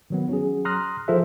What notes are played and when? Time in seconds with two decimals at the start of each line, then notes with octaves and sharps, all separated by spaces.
0.10 D#3 F#3 B3
0.29 F#3 C#4 G#4
0.65 A#5 C6 D#6 F6 F#6 A#6
1.08 F3 F4 G#4 A4 C5 E5